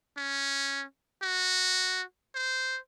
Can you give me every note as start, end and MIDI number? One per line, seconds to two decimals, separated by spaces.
0.18 0.85 61
1.22 2.03 66
2.35 2.78 72